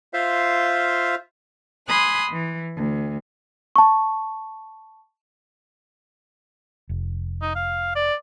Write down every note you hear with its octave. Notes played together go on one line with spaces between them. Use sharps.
F4 C5 E5 F5
G#5 B5 C6 D#6 F#6
E3
D2
A5 C#6
F1
D#4
F5
D5